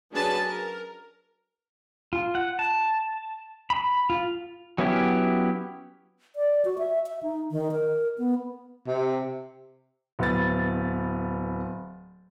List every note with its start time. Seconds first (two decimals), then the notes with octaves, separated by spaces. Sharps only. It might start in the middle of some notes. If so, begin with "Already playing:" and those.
0.12 F#3 C#4 D4 G#4 B4 A5
0.46 A#4
2.13 F4
2.35 F#5
2.59 A5
3.70 B5
4.10 F4
4.78 F#3 B3 C#4 E4 G4
6.36 D5
6.65 F#4
6.78 E5
7.06 E5
7.23 D#4
7.51 D#3
7.72 A#4
8.18 B3
8.87 C3
10.19 D1 B3 A6